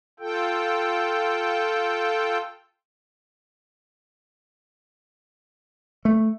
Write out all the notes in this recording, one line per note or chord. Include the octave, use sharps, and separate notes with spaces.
F4 A4 G5
A3